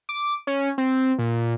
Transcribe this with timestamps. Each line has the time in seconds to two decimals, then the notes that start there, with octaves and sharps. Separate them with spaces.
0.09 D6
0.47 C#4
0.78 C4
1.19 A#2